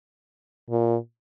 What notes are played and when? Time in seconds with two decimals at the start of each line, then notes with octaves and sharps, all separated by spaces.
0.70 A#2